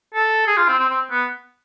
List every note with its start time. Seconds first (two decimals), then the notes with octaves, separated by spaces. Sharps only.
0.14 A4
0.47 G#4
0.57 F4
0.68 C4
0.79 C4
0.90 C4
1.10 B3